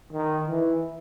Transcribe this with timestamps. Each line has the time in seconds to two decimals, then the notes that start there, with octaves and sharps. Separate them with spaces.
0.12 D#3
0.48 E3